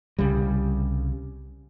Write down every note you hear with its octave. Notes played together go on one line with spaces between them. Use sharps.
C2 C#3 G3